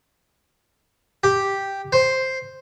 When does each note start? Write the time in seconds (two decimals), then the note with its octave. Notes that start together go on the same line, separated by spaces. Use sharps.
1.24 G4
1.92 C5